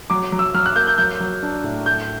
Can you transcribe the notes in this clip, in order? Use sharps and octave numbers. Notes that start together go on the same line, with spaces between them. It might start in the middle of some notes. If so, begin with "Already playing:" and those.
F#3 D6
F#3
E6
F#3 F6
F#6
A#3 G6
G6
F#3 G6
F#3
D4
A2
A3 G6